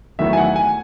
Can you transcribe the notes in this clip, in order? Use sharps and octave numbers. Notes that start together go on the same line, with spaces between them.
E2 D#3 F#3 A3 E4 E5
G#5
F#5
G#5